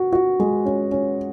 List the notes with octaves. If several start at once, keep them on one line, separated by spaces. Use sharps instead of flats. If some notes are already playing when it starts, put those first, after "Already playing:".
Already playing: F#4
F#4
G#3
C#4
C#4